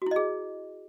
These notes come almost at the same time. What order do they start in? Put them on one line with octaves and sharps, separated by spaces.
F#4 E4 D#5 G#4